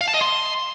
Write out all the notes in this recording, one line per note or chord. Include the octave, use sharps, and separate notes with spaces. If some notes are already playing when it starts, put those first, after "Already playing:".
F5
A5
D#5
C6